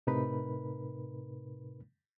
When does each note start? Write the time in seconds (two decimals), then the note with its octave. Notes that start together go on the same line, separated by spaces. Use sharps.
0.07 A2 C3 D#4 A#4 B4 B5